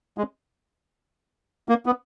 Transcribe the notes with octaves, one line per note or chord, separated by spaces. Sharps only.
G#3
A#3
B3